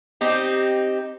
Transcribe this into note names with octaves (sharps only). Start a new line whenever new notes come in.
C4 D#4 G4